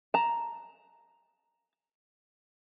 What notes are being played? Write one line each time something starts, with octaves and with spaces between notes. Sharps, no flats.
A5 A#5